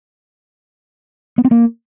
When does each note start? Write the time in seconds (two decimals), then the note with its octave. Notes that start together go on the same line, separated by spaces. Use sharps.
1.38 B3
1.45 C4
1.51 A#3